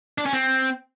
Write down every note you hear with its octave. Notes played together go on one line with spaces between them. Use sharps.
D4
C#4
C4